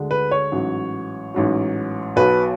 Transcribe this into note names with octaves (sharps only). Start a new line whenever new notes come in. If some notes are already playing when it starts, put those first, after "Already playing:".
Already playing: D2 D3 G#3
B4
C#5
A1 G#2 F#3
A1 G#2 F#3
B1 B2 F#3 B4